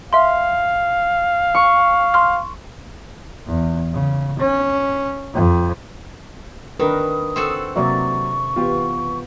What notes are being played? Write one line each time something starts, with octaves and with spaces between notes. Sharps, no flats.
E5 F5 C6
C#6
C6 F6
E2
C#3
C#4
F2
D#3 D4 A#4 B4 D#6
C4 F#4 A4
C3 F#3 A#3 D5 E5 C#6
E3 B3 F4 G4